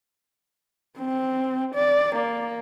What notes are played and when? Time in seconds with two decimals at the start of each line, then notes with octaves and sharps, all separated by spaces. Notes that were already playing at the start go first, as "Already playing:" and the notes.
0.98 C4
1.75 D5
2.16 A#3